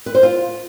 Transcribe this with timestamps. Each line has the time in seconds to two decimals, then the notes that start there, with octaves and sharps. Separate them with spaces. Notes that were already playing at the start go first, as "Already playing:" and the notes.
0.06 B4
0.15 C5
0.23 F4